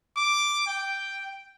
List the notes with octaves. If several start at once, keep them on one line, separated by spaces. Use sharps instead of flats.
D6
G5